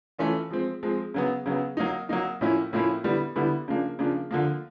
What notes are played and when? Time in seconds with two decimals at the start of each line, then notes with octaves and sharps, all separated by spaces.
0.19 E3 A3 C#4 F4
0.50 F3 G#3 C4
0.83 F3 G#3 C4
1.14 C#3 F#3 B3
1.46 C#3 F#3 B3
1.77 F#3 A#3 D#4
2.09 F#3 A#3 D#4
2.41 A2 F3 A#3 C#4 E4
2.73 A2 F3 A#3 C#4 E4
3.04 D3 G3 B3 E4
3.36 D3 G3 B3 E4
3.68 C#3 F3 A#3 D4
3.99 C#3 F3 A#3 D4
4.31 D3 F3 A#3